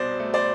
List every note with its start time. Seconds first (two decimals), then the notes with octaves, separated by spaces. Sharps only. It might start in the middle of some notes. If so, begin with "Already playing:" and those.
Already playing: C2 B2 C5 D5
0.19 A3
0.34 C5 D5